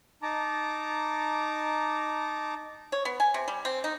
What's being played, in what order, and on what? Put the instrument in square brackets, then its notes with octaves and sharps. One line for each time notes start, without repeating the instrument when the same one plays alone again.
[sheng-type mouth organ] D#4 A5 A#5 D6
[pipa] C#5
B3
G#5
C3
G3
C4
D#4